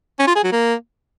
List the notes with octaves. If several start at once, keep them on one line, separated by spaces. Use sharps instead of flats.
C#4
F4
G#4
F#3
A#3